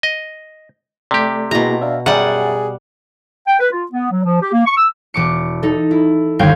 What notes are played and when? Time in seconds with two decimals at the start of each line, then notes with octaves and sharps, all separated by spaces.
0.03 D#5
1.11 C3 A3 G4 A4 D5
1.51 B2 G#3 A#3 E4 F#4 A#5
1.82 D4 E5 F5
2.06 F#2 G3 G#4 E5 F#5 G#5 A6
3.47 G5
3.60 B4
3.71 F4
3.92 B3
4.12 F#3
4.24 F3
4.41 G4
4.53 A#3
4.66 C#6
4.77 E6
5.14 E1 D6 C#7
5.63 D#4 A4
5.91 E4
6.39 G1 D#2 F5 G5 G#6